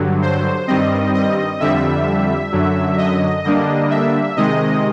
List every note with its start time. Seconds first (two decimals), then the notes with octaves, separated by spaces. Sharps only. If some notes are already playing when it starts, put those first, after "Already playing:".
Already playing: G2 D3 F#3
0.22 C5
0.68 G2 D#3 G3 C4 D#5
1.14 D#5
1.60 F2 D3 G3 E5
2.52 F#2 D3 F#3
2.98 D#5
3.44 D3 G3 A#3 D4 D#5
3.90 E5
4.36 C3 D#3 G#3 D#5